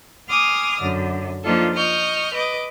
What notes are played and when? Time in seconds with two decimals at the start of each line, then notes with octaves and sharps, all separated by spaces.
0.28 G#5 C6 D6 D#6 F6
0.80 F#2 D3
1.43 F3 A#3 D4 D#4 F4 A4
1.73 D#5 C#6 F6 G6
2.32 B4 D#5 D6